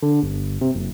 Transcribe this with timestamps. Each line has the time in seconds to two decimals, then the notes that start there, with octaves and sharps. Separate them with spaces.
0.02 D3
0.23 G1
0.61 C3
0.75 F#1